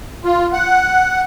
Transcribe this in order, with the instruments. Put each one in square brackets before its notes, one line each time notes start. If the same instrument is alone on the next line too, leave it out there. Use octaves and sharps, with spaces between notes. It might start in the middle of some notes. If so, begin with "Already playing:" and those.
[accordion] F4
F#5